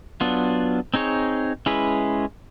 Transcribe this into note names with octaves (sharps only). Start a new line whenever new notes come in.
F#3 B3 D4 F4
C4 D#4 G#4 C#5
G#3 C#4 E4 G#4 B4